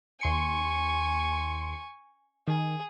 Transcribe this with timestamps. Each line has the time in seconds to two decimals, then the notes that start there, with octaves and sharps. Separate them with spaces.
0.21 D#2 G#5 C6 C#6 C#7
2.48 D#3 G#4